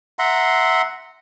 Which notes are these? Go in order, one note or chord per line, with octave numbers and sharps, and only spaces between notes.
E5 F#5 A#5 C6